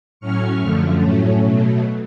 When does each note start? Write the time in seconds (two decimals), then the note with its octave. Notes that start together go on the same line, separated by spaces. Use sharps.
0.20 A2 F#3 C#4 C#6 F6
0.59 F#2 D3 F3 A3
1.00 A2 F#3 A3 C#4
1.40 B2 F#3 A3